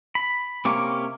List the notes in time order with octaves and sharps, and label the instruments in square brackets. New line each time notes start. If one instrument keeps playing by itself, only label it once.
[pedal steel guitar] B5
[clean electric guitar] C3 A#3 C#4 [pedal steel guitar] D6